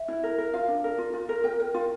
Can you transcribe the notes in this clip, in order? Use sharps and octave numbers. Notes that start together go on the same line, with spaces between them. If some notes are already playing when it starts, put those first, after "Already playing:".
Already playing: E5
E4
A#4
A#4
F4 F5
D4
A#4
F4
F4
A#4
A#4 G5
A#4
F4